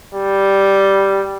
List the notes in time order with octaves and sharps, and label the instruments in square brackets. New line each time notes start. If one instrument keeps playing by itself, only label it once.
[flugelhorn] G3